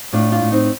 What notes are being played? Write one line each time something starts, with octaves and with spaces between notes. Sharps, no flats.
A2 D4 F4
D4 F4
A2
C4 D#4